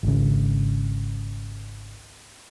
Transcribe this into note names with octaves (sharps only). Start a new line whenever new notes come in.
G#1 C#2 C#3